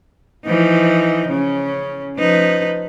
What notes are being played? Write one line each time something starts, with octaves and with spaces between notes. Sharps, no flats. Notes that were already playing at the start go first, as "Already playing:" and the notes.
E3 F3 D#4
C#3 C#4
F3 D#4 B4